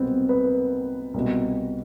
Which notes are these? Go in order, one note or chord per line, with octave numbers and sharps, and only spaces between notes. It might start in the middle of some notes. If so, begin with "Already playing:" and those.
Already playing: C2 B2 B3 C4
B4
C2 B2